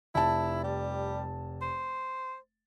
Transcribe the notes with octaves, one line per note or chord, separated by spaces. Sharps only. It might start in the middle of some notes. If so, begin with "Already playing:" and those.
F1 E4 A5
G3
C5